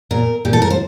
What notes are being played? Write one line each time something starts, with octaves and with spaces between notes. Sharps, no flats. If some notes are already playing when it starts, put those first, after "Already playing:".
A#2 A#4
A#2 G4
A4
A#4
C5